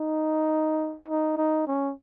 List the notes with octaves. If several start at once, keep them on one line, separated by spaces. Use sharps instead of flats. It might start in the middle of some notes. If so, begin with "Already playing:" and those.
Already playing: D#4
D#4
D#4
C#4